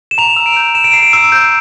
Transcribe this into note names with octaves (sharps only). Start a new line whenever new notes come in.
E7
A#5 F7
E6
D7
G6
A#5 E7
D7
A#5 C7
D7
E6
G6